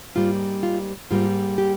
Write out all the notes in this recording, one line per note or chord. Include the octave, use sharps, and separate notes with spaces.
G#2 G3 A#3 F4
F4
G#2 G3 A#3 F4
G4